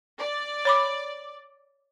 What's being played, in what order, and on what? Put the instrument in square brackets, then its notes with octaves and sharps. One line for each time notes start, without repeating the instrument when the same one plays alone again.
[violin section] D5
[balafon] C#5 B5 D6